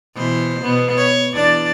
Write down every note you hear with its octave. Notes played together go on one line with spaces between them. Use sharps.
B2 E3 C5
B2 B3
C#5
E2 D4 D5